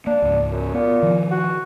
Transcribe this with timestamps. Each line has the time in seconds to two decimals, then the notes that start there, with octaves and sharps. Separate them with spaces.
0.07 A#3 D4
0.22 C#2 G#2
0.52 F#2
0.74 A#2 B3
1.02 D#3 F3
1.31 F#4